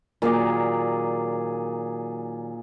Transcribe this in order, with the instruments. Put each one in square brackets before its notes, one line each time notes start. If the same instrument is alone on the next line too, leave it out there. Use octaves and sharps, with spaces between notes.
[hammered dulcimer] A#2 G#4 D5 [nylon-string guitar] D#3 F#3 A#3